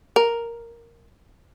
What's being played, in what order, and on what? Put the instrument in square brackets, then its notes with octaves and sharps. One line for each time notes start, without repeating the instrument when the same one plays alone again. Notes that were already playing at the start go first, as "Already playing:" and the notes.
[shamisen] A#4